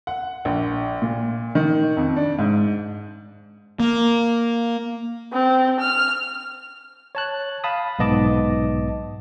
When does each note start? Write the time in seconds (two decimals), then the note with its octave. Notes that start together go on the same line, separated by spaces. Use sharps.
0.07 F#5
0.45 A#1
1.02 A#2
1.55 D#3
1.97 F2
2.16 D4
2.39 G#2
3.80 A#3
5.33 C4
5.80 F6
7.15 C#5 A5 F#6
7.64 F5 A5 B5 D#6
7.99 B1 G#2 B3 D#5 A5 D6